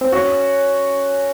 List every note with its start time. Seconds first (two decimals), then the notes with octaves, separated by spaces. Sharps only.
0.01 C4
0.12 C#4 F#4